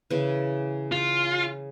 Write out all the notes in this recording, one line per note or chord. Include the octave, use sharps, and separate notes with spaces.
C#3 E3
F4